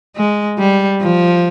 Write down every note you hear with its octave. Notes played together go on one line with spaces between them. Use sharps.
G#3
G3
F3